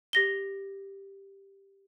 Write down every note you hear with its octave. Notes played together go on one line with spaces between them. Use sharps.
G4 A#6 G7